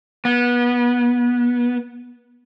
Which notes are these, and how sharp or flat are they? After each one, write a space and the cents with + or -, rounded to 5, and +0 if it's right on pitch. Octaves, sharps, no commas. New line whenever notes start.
B3 -25